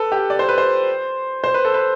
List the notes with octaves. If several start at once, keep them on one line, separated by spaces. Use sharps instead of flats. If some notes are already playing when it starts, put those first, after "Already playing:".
Already playing: A4 B4
G4
D5
C5
B4
C5
C5
B4
A4
B4